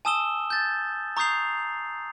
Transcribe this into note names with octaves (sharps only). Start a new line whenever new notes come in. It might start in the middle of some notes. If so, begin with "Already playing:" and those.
G#5 A5 D#6 E6 E7 G7
G6 A6
A#5 C#6 D#6 G6 C7 F7